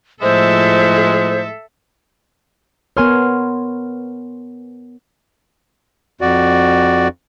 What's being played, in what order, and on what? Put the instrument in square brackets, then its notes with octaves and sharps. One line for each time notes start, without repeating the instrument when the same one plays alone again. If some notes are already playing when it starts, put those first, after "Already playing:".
[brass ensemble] A2 F3 [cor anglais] G#3 [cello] A4 E5 [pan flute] C5
[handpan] B3 A#4 C#5 [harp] G#5 C6 F6
[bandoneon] F2 F#4 D5